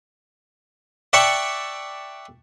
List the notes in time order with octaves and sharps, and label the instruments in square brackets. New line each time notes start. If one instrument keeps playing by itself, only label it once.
[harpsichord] D5 E5 F#5 G5 A5 C#6